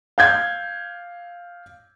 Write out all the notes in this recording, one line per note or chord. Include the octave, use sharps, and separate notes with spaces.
F5 G6 G#6